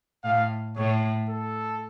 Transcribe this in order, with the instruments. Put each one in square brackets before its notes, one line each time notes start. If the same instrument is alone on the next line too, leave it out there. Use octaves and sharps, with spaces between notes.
[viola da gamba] A2 [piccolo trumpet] F5
[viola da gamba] A2 [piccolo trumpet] C#5
[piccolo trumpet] A4